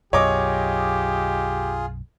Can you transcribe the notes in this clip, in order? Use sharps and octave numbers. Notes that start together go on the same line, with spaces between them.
B1 F#2 F4 G4 G#4 C#5 D#5 D6